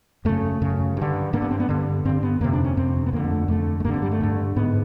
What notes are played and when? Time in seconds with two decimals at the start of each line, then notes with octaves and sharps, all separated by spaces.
0.25 F#2 C#3 A3
0.61 F#2 C#3
0.97 G2 D3
1.33 G2 D3 A#3
1.42 B3
1.51 C4
1.60 B3
1.69 G2 D3
2.05 G2 D3 C4
2.23 B3
2.41 F2 A#3
2.44 C3
2.53 D4
2.65 C#4
2.77 F2 C3 C4
3.06 B3
3.13 F2 A#3
3.16 D3
3.24 A#3
3.31 A3
3.48 F2 D3 A3
3.80 A3
3.84 G2 D3 A#3
3.94 C4
4.02 G3
4.12 A3
4.21 G2 D3
4.56 G#2 B3